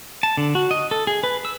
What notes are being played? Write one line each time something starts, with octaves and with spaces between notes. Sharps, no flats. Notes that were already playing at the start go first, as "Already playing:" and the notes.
A5
D3
F#4
D#5
A4
G#4
B4
E6